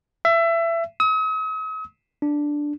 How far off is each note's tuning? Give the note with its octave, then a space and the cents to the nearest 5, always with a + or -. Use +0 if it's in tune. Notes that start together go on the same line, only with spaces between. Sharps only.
E5 +25
D#6 +45
D4 +0